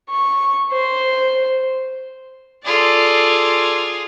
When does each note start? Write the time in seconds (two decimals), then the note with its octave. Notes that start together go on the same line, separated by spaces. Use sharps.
0.10 C#6
0.71 C5
2.65 F4 G#4 A4 D5